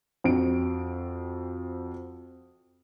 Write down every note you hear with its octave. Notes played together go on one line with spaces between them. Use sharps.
F2 C4 F#4 D7